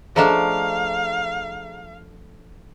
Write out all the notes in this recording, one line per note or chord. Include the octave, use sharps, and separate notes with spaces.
F3 A3 D4 G#4 D#5 F5 A#5